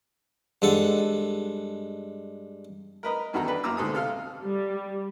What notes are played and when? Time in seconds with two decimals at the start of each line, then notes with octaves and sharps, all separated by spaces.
0.62 G2 G#3 A4 F#5
3.03 A#4 B4 D#5 A#5
3.33 E2 G2 D#3 F#4 A4 A#5
3.47 D4 B4
3.64 F#2 A#3 A#5 D6 E6
3.77 D2 G#2 A4 D#6
3.93 C3 A4 F5 F6
4.44 G3